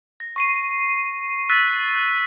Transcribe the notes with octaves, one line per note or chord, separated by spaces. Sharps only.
A#6
C#6 C7 D#7
E6 F#6 A6 B6 D#7
F#6